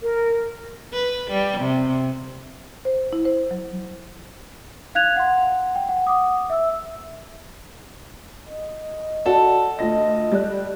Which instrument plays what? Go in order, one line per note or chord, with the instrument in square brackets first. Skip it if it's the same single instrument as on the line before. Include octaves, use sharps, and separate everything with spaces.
[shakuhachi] A#4
[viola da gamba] B4
G3
C3
[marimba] C5
E4
C5
F#3
[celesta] F5 F#6 G#6 F7
F#5 C6
G5
F#5
F#5 D6 D#6
E5 E6
[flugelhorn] D#5
[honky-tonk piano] F#4 D5 [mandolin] A4
[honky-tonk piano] D2 F4 A#6 [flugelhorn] D#5
[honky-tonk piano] G3 D5 F#6